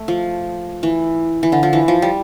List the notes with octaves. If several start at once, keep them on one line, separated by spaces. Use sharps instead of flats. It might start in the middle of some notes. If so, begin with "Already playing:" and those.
Already playing: A3
F3
E3
E3
D3
F3
E3
F3
G3